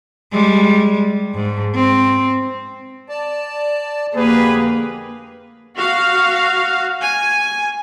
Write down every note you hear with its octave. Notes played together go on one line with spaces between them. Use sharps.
G3 G#3
G#2
C4
D5 A5
F2 D3 A#3 G4 G#4 B4
F#4 F5
G#5